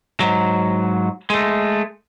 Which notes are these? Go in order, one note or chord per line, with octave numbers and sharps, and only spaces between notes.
G#2 F#3
G#3 A3